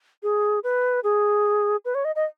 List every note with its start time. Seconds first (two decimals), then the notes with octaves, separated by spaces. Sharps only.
0.23 G#4
0.64 B4
1.04 G#4
1.85 B4
1.95 C#5
2.05 D#5
2.16 D#5